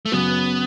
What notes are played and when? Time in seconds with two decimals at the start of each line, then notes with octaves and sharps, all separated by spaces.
0.06 A3
0.12 F#2 C#3 F#3 B3 C#4 F#4